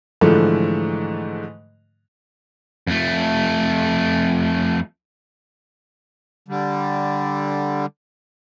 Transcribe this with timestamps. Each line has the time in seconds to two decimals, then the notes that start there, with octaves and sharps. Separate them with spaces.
0.21 G#2 D3 E3 F3 A3
2.87 F2 A3
6.48 D3 G3